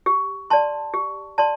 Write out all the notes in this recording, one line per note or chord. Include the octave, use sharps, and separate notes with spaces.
G4
D5 A5 C6
G4
D5 A5 C6